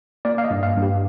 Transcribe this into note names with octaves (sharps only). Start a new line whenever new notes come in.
A#3 D5
F5
D#5
G2
F5
G2
G4